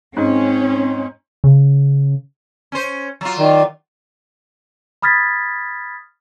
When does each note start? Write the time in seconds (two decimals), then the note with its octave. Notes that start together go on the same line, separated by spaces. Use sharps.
0.17 G#2 C4 C#4
1.44 C#3
2.72 C#4 C5
3.21 F#3 F4
3.38 D#3 D5
5.02 B5 D#6 F6 G#6 A6 B6